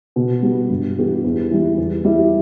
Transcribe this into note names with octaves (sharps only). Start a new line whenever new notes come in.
B2
G3 B3
G2
E3 B3 G4
E2
E3 G3
E2
E3 G3 E4 G4